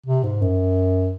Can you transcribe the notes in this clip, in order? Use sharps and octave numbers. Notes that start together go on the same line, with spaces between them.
C3
G#2
F#2